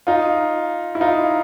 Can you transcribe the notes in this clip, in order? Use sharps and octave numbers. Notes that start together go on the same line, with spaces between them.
D#4 F4
E4
D#4 F4